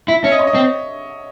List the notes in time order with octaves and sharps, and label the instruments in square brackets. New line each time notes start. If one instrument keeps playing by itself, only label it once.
[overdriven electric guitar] E4
[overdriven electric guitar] C#4 [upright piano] E5
[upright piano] D#5
C#5
D#5
[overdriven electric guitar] C4